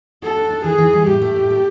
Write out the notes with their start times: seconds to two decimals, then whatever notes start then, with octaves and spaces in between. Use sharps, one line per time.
0.22 F#4 A4
0.37 D4
0.50 D4
0.64 E3 G#4
0.78 E3
0.93 G3
1.07 A2 G4
1.22 A3
1.36 A2
1.50 A3